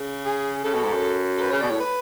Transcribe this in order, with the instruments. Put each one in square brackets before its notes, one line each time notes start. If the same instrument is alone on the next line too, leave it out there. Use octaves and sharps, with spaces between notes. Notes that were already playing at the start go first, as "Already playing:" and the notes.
Already playing: [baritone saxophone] C#3
[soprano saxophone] G#4
[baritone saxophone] C#3 [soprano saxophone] A4
[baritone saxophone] B2
G#2
F#2
[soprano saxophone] A4
B4
[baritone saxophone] C#3 [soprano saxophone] C#5
[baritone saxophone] B2 [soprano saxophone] D5
[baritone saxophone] A2 [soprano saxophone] C#5
[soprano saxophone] B4